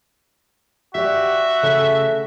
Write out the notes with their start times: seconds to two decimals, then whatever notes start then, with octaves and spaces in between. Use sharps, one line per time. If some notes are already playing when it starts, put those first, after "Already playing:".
0.95 F#4 G4 D5 E5
1.63 C#3 A3